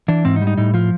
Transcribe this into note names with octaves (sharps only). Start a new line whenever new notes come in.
E3 D4
G#2 C4
D#4
G3
D#4
A2 D#4
F3 F4